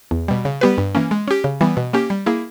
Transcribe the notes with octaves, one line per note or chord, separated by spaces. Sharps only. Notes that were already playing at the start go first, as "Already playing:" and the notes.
E2
B2 G3
C#3
G3 B3 G4 B4
G2
E3 A#3 C#4
G#3
C#4 G4
C#3
E3 G3 B3
B2
A#3 C#4 G4
G3
A#3 E4 G#4